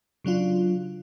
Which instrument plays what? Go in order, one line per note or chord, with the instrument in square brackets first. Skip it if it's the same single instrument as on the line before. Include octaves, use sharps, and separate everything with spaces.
[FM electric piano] C#3 F#3 D4 F4